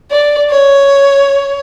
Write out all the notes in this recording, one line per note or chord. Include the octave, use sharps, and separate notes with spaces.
D5
C#5